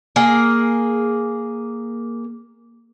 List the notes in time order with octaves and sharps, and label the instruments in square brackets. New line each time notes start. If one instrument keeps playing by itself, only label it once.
[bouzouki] A#3 G#4